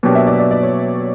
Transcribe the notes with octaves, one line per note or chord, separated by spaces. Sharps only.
B2 F#3 A#3 D4 G4
E5
D5
D5
D5
C#5